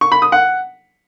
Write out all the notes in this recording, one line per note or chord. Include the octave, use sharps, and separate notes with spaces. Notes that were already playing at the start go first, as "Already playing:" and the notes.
C#6
B5
D#6
F#5